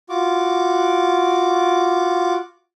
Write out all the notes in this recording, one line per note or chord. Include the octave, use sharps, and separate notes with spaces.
F4 F#4 D6